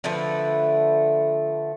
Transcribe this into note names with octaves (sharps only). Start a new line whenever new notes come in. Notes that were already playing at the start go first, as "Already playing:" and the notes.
D3 F3 A3 B4